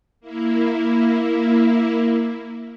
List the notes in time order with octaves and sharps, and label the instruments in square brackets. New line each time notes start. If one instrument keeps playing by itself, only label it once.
[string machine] A#3 E4